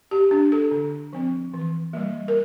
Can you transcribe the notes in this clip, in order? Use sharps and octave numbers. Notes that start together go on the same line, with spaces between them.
G4
D4
A4
D3
F3 C4
E3
G3 A#3
A#4